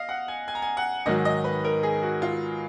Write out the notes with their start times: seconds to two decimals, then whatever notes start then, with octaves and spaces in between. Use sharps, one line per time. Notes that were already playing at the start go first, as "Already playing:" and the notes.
Already playing: D#5 F5
0.09 F#5
0.28 G#5
0.48 G#5
0.55 A#5
0.62 G#5
0.77 F#5
1.06 G#2 D#3 F#3 D#5
1.25 D#5
1.44 B4
1.64 A#4
1.83 G#4
2.03 F#4
2.22 F4